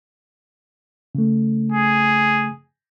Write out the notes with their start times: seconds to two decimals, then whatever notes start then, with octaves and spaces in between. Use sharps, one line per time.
1.15 C#3 A3
1.72 G#4